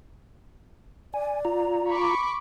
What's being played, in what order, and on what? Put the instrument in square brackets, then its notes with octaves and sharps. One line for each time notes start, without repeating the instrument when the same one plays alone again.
[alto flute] D5 [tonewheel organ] G#5
[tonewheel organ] F4 A#5
[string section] B5 C#6 D6